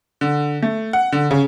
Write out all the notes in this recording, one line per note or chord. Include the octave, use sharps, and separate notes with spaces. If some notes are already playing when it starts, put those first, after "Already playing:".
D3
A3
F#5
D3
C#3